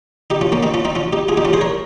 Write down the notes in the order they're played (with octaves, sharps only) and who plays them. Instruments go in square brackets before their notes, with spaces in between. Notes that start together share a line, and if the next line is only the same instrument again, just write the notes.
[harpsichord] D#4 G4
C#4 F4
A#3 C#4
C4 D#4
C#4 F4
C4 D#4
C#4 F4
D#4 G4
F4 G#4
D#4 G4
C#4 F4
G#4 C5
A#4 C#5